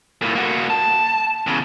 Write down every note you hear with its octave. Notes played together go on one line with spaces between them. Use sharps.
A2 A#3
A#3 F#4
A5
E2 C#3